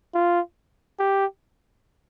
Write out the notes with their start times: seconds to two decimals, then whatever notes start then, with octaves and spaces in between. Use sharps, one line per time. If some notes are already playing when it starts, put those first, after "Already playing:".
0.14 F4
1.00 G4